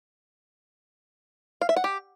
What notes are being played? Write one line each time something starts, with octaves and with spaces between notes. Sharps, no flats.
F5
E5
F#5
G4